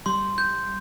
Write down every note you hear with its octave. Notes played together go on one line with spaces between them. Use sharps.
G3 C6
G6